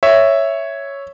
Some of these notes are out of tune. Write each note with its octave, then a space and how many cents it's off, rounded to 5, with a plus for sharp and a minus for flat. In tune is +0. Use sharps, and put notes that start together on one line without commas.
C#5 +0 E5 +0